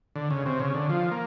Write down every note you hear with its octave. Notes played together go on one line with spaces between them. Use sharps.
D3
C#3
C3
C#3
D3
F3
A#3